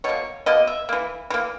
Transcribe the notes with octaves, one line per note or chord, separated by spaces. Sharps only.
B2 A#3 C#5
B2 A#3 D#5
E5
E3 A#3
E3 A#3